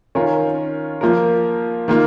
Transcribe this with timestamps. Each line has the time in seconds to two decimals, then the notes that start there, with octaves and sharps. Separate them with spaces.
0.15 D#3 C#4 F4 A#4
1.01 F3 A#3 F4 A#4
1.88 D#3 A#3 F4